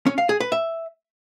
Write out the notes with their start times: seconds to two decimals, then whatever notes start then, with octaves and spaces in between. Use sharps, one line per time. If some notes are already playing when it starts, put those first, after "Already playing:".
0.06 C#4
0.18 F5
0.29 G#4
0.40 B4
0.52 E5